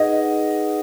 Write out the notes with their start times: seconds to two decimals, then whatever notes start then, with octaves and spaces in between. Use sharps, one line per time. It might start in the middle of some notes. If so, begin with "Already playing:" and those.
Already playing: D#4 G#4 B4 D#5 F#5
0.20 F#5
0.47 D#4